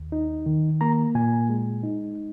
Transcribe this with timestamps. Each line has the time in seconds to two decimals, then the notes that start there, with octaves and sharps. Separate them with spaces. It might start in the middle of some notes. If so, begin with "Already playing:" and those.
Already playing: D#2
0.12 D#4
0.46 D#3
0.81 A#3 A#5
1.15 A#2 G#5
1.49 G#3
1.83 D#4